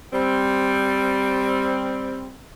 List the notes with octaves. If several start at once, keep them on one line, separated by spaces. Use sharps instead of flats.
G3 C4